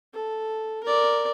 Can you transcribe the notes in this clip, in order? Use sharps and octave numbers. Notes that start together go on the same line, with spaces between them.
A4
A#4 D5